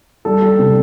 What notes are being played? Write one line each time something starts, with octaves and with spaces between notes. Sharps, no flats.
G3 A4
G3
C3